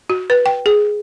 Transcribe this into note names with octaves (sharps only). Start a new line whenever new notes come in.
F#4
B4
G5
G#4